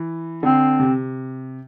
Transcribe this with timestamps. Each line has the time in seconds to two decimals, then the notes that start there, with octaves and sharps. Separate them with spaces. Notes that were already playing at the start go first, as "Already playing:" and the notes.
Already playing: E3
0.43 D3 C4
0.80 C3